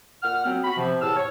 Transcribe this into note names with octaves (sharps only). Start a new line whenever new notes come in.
A#2 F#5 F6
F#3 B3 C4
F#4 B5
C3 F3
E2 A2 A5 E6 F6
C#5